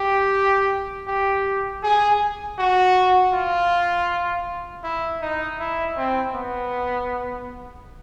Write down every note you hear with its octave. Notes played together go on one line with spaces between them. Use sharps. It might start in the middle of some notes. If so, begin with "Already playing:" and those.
Already playing: G4
G4
G#4
F#4
F4
E4
D#4
E4
C4
B3